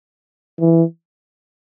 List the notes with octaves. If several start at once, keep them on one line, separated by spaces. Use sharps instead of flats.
E3